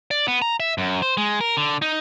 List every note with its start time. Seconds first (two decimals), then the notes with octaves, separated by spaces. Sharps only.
0.11 D5
0.28 B3
0.42 A#5
0.60 E5
0.78 F#2
1.02 C5
1.17 G#3
1.41 A#4
1.57 D3
1.82 D#4